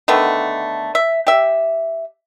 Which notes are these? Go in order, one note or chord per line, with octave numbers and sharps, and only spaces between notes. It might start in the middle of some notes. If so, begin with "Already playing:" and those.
D3 D#3 A3 B3
E5
G4 E5